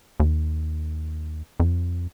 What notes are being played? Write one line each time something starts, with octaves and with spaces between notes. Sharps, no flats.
D#2
F2